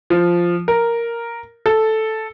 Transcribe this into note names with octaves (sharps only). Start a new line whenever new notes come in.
F3
A#4
A4